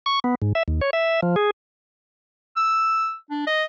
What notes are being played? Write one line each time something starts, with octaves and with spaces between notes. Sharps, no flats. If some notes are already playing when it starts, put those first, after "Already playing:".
C#6
B3
G#2
E5
D#2
C#5
E5
F3
G#4
E6
D4
D#5